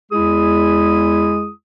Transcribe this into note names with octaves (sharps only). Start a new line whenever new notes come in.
E2 G#3 E4 G#4 D#6